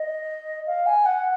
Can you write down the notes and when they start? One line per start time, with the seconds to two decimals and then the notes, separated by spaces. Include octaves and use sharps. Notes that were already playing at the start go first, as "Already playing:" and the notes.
Already playing: D#5
0.67 F5
0.86 G#5
1.06 F#5